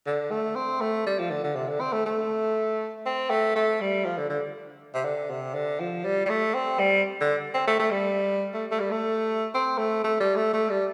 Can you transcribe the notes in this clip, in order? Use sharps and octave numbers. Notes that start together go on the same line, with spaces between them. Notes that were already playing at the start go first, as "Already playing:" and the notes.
D3
A3
C4
A3
G3
F3
D3
D3
C3
D3
C4
A3
A3
C4
A3
A3
G3
F3
D3
D3
C3
D3
C3
D3
F3
G3
G3
A3
C4
G3
D3
C4
A3
A3
G3
A3
A3
G3
A3
C4
A3
A3
G3
A3
A3
G3